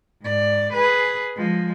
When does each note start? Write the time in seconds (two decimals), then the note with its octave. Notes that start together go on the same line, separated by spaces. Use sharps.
0.23 G#2 D5
0.73 G#4 B4
1.36 F3 G#3